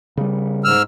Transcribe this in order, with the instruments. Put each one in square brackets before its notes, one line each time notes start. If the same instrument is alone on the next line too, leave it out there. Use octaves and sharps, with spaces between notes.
[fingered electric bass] C#3 G3
[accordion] G#2 E6 F6